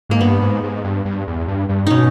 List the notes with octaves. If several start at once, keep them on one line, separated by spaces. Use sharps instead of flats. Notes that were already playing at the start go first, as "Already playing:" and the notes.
G#2 A#3
G2 B3
G#2
G#2
G2
G2
E2
G2
G2
B2 C#4 D#4